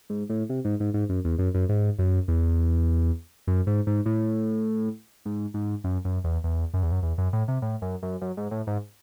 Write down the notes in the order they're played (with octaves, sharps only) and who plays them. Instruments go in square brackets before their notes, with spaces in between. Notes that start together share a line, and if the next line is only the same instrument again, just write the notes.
[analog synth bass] G#2
A2
C3
G#2
G#2
G#2
F#2
E2
F#2
F#2
G#2
F#2
E2
F#2
G#2
G#2
A2
G#2
G#2
F#2
F#2
E2
E2
F#2
E2
F#2
E2
F#2
A2
C3
A2
F#2
F#2
F#2
G#2
A2
G#2